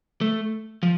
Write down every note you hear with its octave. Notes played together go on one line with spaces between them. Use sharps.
A3
F3